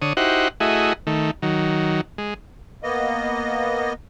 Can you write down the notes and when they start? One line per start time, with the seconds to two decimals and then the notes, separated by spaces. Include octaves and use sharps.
0.02 D3 C#5 D#6
0.17 D#4 E4 F#4 G4 C5 F#5
0.60 A3 E4 F#4 G#4 D#5
1.07 D#3 A3
1.42 D#3 F#3
2.18 G#3
2.83 A#3 B3 D#5